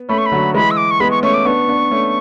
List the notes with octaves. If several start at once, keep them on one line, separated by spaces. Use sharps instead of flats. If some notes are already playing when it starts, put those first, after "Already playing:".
Already playing: B3
A3 C#4 B5
C#6
B5
D3 F#3
E3 G#3 B5
E6
D6
C#6
G#3 B3 B5
C#6
A3 C#4 C#6
D6
B3 D4 C#6
B3 D4
A3 C#4